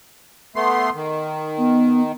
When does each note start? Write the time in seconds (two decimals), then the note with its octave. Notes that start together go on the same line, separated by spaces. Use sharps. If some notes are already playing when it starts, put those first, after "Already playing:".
0.56 A3 B3 C6
0.95 D#3
1.58 B3